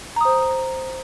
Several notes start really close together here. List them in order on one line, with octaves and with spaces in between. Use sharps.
A#5 D#6 C5